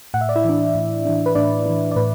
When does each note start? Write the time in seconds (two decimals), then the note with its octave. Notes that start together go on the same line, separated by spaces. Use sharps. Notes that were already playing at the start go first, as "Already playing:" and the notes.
0.14 A2 F#5
0.21 E5
0.29 D5
0.36 E4 E5
0.45 E3 D4
0.75 A2
1.05 E3 D4
1.26 B4
1.35 A2 D4 D5
1.66 E3 D4
1.91 D5
1.96 A2 B4